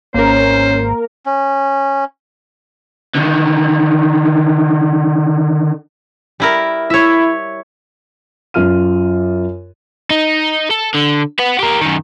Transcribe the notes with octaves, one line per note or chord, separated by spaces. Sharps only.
G#1 A#3 C#4 A#4 C5 C#5
C#4
D3 D#3
G3 E4 A#4
E4 C#5 E5
F#2 F4 F6 D#7
D#4
A4
D3
B4 F#5
G4 A#4
F#2 D#3